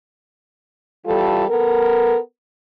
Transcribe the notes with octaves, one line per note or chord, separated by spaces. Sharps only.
E3 G3 F4 A4
B3 A4 A#4